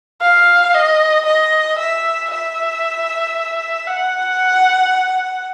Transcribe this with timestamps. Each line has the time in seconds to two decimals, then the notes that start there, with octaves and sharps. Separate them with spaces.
0.21 F5
0.74 D#5
1.25 D#5
1.78 E5
2.30 E5
3.87 F#5